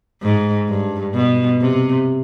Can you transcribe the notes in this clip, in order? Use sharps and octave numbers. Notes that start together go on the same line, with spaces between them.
G#2
G2
B2
C3